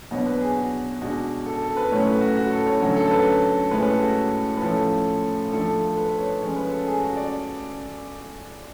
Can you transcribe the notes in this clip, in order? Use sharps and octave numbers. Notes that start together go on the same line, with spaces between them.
B2 F#3 B3 D4 C#5
B4
G#4
F#4
B2 G#3 D4 F#4
A4
A4
B4
A2 F#3 A3 C#4 C#5
B4
F#4
F#4
A4
C#5
D3 F#3 A3 C#4 C#5
A4
A4
B4
A2 G#3 C#4 B4
B4
A4
F#4
B4
A2 F3 A3 C#4 A4
F3 A3 D4 A4
A4
B4
B4
C#5
F3 G#3 C#4 C#5
B4
A4
G#4
F#4
D5